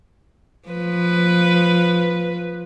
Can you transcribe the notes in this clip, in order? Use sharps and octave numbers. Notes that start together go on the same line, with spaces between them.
F3 B4